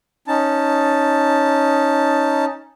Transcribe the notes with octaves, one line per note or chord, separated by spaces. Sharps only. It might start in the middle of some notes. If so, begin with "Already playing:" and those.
C#4 D#4 A5